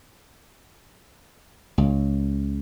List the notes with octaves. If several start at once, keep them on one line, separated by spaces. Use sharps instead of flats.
C#2